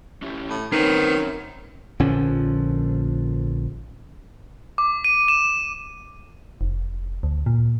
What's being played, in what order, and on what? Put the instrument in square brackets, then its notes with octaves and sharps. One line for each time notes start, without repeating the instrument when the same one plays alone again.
[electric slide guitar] C#4 E4 G4
[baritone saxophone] A2
[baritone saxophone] D#3 [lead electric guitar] C4 B4 [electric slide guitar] C#4 A#4 C#5
[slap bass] A#1 D3 F3 C#4
[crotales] D6
D#7
E7
[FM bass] F1
D2
A#2